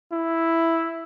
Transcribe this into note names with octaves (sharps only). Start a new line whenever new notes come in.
E4